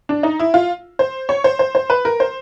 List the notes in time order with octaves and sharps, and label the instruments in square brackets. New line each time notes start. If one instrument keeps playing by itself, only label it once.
[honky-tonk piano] D4
D#4
E4
F4
C5
C#5
C5
C5
C5
B4
A#4
C5